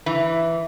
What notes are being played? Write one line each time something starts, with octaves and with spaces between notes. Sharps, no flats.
E3